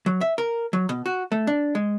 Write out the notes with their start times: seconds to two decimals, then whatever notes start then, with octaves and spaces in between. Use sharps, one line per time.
0.06 F#3
0.21 E5
0.38 A#4
0.73 F#3
0.89 B2
1.06 F#4
1.32 A3
1.47 D4
1.75 G#3